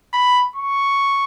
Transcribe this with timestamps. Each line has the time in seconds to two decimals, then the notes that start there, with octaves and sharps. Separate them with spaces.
0.14 B5
0.56 C#6